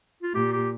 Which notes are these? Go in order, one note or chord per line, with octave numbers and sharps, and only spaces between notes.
F4
A#2 G4
G4